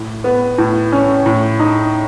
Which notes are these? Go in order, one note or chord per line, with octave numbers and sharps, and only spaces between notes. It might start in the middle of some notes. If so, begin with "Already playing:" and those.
Already playing: A2
B3
A2
C#4
A2
D#4